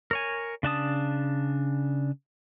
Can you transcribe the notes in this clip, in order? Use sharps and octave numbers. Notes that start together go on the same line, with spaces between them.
A#4 C#5 G#5
C#3 D4 A5 D#6